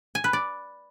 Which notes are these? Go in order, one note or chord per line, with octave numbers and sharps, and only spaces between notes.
G#5
B4
D5